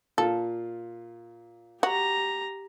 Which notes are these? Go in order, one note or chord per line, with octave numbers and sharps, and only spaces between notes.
A#2 F4 A4
F#4 G4 A#5